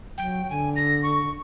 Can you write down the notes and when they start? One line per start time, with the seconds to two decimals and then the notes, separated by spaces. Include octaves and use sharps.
0.18 F#3 G5
0.50 D3 G#5
0.76 A#6
1.03 C#6